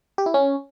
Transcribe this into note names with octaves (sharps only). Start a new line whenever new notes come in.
G4
E4
C#4